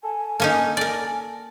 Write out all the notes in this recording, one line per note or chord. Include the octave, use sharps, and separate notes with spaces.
A4 G#5
A#3 C#4 D#4 A4
A#4 D5